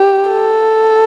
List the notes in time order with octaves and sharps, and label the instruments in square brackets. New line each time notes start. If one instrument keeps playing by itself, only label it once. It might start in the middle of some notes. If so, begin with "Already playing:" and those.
Already playing: [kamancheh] G4
A4